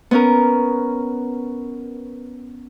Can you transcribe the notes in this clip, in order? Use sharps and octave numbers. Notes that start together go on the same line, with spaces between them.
B3 C#4 A#4